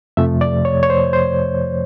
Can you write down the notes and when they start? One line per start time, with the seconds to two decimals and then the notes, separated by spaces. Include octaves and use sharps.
0.17 F2 C3 F3 A3 E5
0.41 D5
0.65 C#5
0.83 C#5
0.90 C5
1.13 C5